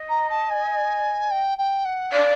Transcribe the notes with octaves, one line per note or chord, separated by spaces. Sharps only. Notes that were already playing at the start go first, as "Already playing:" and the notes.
Already playing: D#5
A#5
A5
G#5
G5
G5
F#5
D5 F5